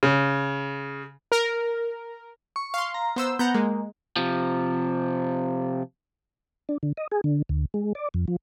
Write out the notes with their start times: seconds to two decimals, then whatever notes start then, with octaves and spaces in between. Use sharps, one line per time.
0.03 C#3
1.32 A#4
2.56 C#6
2.74 F5 C6
2.94 A#5
3.16 B3 C5 E6
3.39 B3 F#5 A#5 G6
3.54 G#3 A#3
4.16 C3 F3
6.69 D4
6.83 D3
6.97 D#5
7.12 G#4
7.24 D3
7.49 D2
7.74 G#3
7.95 D5
8.14 F2
8.28 F3